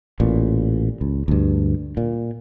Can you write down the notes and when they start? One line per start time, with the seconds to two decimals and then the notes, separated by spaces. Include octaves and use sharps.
0.20 A1 A#2
1.01 C#2
1.28 D2 G2
1.97 A#2